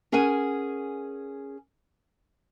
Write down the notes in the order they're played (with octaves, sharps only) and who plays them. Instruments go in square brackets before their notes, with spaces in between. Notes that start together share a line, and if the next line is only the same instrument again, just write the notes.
[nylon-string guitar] C#4 G#4 A#4 F#5 G#5